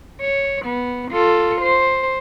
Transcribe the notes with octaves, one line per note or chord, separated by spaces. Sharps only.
C#5
B3
F4 A4
C5